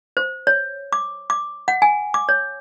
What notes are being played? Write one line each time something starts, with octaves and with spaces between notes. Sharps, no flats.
C5
C#5
D6
D6
F#5
G#5
D6
C#5